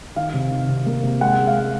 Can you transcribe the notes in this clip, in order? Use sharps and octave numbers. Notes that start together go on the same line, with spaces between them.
D#3 F5
C3
D#3
C3
A#3
C3
G#3 F#5
G#3
F5
G#3